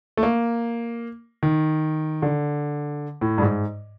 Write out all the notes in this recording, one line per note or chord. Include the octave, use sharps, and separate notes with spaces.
A3
A#3
D#3
D3
A2
G2
G#2